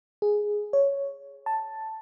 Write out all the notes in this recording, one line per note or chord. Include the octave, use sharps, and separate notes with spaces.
G#4
C#5
A5